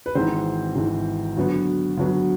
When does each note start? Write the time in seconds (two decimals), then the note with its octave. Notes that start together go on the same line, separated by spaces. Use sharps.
0.06 B4
0.15 G#1 G#2 E3 C4 C5
0.76 G#1 G#2 E3
1.37 D2 D3 F#3 B3
1.97 D2 D3 F#3 B3